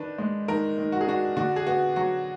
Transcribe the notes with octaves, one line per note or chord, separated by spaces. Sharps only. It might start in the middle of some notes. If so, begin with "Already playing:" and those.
Already playing: D#3 D4 B4
G#3
D#3 A#4
D#3
F#4
G#4
D4 F#4
D3 F#4
G#4
B3 F#4
F#3 F#4